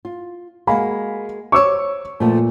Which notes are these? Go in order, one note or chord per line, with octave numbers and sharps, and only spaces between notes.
F4
G#3 A#3 F#4 F5 G#5 B5
C5 C#5 C#6 D6 E6
A#2 F3 A3 B3